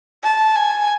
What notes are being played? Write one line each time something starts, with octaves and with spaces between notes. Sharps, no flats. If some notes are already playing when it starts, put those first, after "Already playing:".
A5
G#5